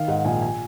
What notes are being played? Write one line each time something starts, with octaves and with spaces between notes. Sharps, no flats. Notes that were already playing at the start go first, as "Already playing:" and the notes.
Already playing: D#3 F5
G#2 F#5
A#1 G#5
G#5